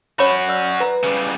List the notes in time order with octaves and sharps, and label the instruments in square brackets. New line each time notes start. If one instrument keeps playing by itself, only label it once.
[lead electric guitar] C#4 F#4 [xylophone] C#5 B5
[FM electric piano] D5 E6 F6
B4 A#5
[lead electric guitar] C#3 G3